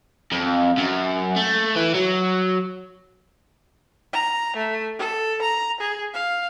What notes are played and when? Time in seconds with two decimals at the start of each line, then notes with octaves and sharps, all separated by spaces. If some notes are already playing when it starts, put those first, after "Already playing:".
0.32 F2
0.78 F#2
1.37 A3
1.76 E3
1.95 F#3
4.13 A#5
4.57 A3
4.99 A4
5.42 A#5
5.81 G#4
6.14 F5